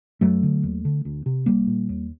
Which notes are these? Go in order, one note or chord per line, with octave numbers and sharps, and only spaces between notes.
F#2 F#3 A3
D3
D#2
D3
D2
C3
C2 G3 A#3
A#2
D#2